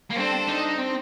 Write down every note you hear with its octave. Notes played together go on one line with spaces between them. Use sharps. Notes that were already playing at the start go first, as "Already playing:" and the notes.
A#3
G3 C4 D4 A4 C5
D#4
C4